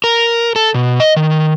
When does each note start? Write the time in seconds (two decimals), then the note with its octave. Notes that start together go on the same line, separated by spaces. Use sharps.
0.04 A#4
0.56 A4
0.75 B2
1.00 D#5
1.17 D#3